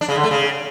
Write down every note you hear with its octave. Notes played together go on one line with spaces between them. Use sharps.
D4
C#3
D3
A3
C#3